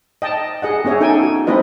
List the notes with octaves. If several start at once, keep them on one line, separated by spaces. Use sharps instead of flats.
D#5 G5 A5
G#4 D#5 F#5
B3 C#4 G#4 C#5 E5
D#4 A4 G5 G#5
F#4
A3 C4 E4 B4 D#5